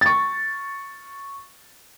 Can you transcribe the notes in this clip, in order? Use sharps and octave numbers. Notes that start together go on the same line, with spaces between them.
C#6 A6